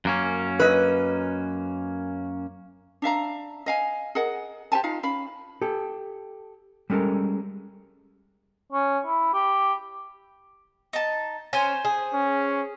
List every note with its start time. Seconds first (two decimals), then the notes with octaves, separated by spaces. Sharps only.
0.05 F#2 A#3 C#4
0.60 B4 D#5
3.02 D4 E5 F5 A#5
3.66 D#5 F5 G#5
4.15 G#4 A#4 D#5 F#5
4.72 G4 C5 G#5 A5
4.84 D#4 F4 F5
5.03 C#4 F5 B5
5.62 G4 A4
6.90 G3 G#3 C#4 A4 A#4
8.72 C#4
9.06 E4
9.34 G4
10.93 D#4 A5
11.53 C#4 C5 G#5
11.85 G#4
12.13 C#4